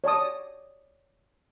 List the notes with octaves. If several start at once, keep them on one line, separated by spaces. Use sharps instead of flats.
C#5 D5 A5 D#6